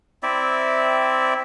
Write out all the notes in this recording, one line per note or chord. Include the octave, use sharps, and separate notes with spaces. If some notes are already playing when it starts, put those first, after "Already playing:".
C4 E4 D5 E5